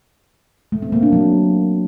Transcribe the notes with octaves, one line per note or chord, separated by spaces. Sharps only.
A3
C4
A#3
D4
F#3